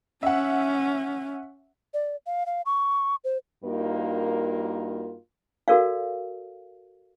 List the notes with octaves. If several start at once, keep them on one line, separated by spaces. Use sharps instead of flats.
C#4 E5 F#5
D5
F5
F5
C#6
C5
G2 A#3 D#4 F4 F#4 A#4
F#4 A4 A#4 D5 F5